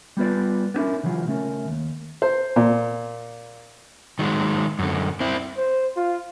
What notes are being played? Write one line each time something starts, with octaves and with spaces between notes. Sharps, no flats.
G3 B3 F4 B4 D5
B3 C#4 D4 E4 A#4
C#3 E3 F#3 F4
C#3 A3 C#4 A#4
D#2
C5
A#2
D#3 F#3 G#3
F#2 D3
C4 E4
C5
F4